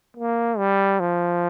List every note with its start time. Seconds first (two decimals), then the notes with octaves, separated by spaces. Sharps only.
0.17 A#3
0.58 G3
1.00 F3